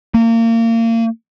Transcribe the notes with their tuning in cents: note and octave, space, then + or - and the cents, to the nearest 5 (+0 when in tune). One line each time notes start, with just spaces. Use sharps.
A#3 -30